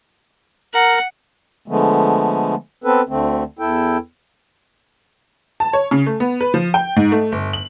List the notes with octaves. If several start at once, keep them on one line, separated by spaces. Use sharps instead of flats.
A#4 F#5 A#5
D3 F3 G#3 A3 B3
B3 C4 A4 B4
D2 D3 A3 C4
E2 E4 A4 G5
A5
C#5
C#3
A3
B3
B4
F3
G5
G#2
A3
G1
F#7